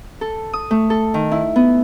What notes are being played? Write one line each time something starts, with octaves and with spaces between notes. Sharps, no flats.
A4
D#6
A3
A4
D#3
E4
B3